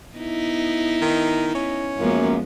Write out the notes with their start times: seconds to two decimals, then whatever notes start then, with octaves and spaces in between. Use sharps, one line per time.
0.16 B3 D#4 E4
1.01 D#3
1.54 C#4
1.98 F#2 F3 G#3 A#3 B3